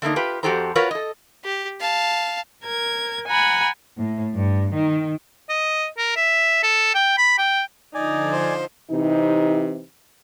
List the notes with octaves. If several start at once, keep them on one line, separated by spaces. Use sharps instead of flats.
D3 A3 A#3 D#4
F4 G4 B4
F2 F#4 G4 A4 C5 A#5
F4 F#4 A#4 B4 C#5
A4 D#5
G4
F5 A5
A#4 G#6
F#5 G#5 A#5 B5
A2
G2
D#3
D#5
A#4
E5
A4
G5
B5
G5
D3 F3 D#4 D5 G#5
C5
C3 E3 D#4